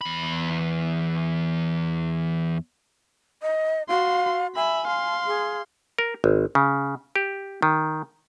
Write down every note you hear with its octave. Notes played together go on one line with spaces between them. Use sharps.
E2 B5
D#5
F#4 F5 C6
E5 G#5 B5
F5 C6
G#4
A#4
G#1
C#3
G4
D#3